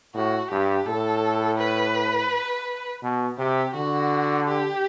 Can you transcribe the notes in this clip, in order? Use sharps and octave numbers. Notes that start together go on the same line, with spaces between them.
A2 F#4
G2 G4
A2 A4
B4
B2
C3 G4
D3 F#4
G4